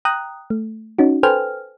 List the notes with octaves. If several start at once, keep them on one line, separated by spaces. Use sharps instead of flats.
G5 A#5 D#6 F#6
A3
C#4 D#4 F#4
A4 B4 C5 G5 G#5 F6